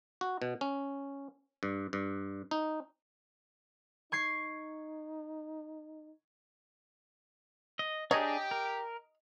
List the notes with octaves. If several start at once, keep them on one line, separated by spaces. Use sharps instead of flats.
F#4
B2
C#4
G2
G2
D#4
D#4 C#6 G#6 C7
D#5
D4 G4 G#4 C#5 D#5 A#5
A#4